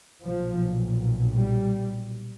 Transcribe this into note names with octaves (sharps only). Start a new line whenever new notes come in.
B1 A#2 F3
G3